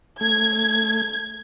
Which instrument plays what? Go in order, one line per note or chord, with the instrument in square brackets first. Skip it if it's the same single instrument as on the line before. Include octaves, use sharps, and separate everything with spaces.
[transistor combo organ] A3 [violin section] G#6